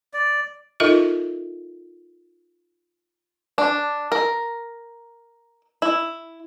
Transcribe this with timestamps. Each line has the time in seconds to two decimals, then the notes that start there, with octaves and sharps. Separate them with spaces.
0.14 D5
0.80 D#4 F4 A4 A#4 D#5 E5
3.58 D4
4.12 A#4
5.82 E4